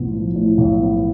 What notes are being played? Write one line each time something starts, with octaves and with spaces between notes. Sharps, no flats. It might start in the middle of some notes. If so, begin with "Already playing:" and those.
Already playing: B1 A2 F3 B3
F3
A2
B1
B3